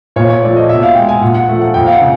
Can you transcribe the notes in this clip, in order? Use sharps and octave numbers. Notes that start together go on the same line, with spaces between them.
A#2 C#5
C#5
F3 A3 D5
D#5
B2 E5
F5
G#3 G5
G#5
A#2 F#5
F#5
F3 A3
F#5
F2 G5
F5
F#5
C#3